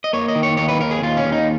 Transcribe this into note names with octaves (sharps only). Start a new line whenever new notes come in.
D#5
A#3 C#5
D#5
D#3
C#5
D#2 C#5
B4
D#2 A#4
G#4
D#2 F4
C#4
D#2
D#4